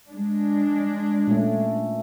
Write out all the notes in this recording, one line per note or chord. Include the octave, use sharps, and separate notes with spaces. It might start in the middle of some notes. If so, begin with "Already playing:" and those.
G#3 D4
A#2 A3 C#4